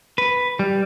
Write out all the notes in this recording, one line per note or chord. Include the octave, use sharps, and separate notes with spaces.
B4
G3